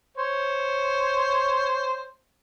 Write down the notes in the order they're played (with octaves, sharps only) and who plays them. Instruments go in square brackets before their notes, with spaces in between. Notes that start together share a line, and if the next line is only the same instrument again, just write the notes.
[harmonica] C5 C#5